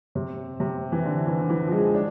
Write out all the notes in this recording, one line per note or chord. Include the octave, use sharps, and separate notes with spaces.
C3
C3
E3
D3
E3
D3
E3
F3
G#3
D4